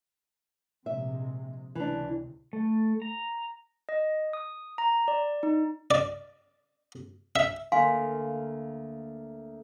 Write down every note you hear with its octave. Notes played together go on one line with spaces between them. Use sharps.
A#1 C3 G#3 E5
C#2 C3 E3 D4
A3
A#5
D#5
D#6
A#5
D5
D#4
D5
E5
D2 A#3 F5 G#5 C6